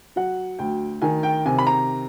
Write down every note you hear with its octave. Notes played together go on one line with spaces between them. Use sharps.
F#3 F#5
D2 G5
D#3 G#5
G5
C3 G#5
B5
A#5